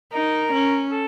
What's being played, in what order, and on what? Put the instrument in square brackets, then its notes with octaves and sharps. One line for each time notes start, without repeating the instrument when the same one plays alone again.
[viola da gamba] D#4 [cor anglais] A#4
[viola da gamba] C#4
[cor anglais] A4